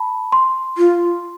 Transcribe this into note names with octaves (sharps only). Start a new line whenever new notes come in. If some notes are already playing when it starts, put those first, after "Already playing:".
Already playing: A5 B5
C6
F4